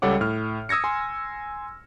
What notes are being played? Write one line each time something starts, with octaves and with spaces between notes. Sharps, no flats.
C#2 G3 A4 C#5 F#5 D6
A2 F6
D#6 E6 G#6 A#6 C#7
G#5 C6